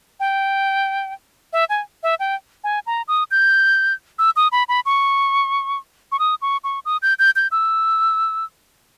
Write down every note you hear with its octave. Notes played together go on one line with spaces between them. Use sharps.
G5
E5
G#5
E5
G5
G#5
A#5
D#6
G6
E6
D#6
B5
B5
C#6
C#6
D#6
C#6
C#6
D#6
G6
G6
G6
E6